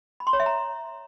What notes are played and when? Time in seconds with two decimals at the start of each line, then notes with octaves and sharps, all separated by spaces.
0.20 B5
0.27 C6
0.33 C#5
0.40 E5
0.46 A#5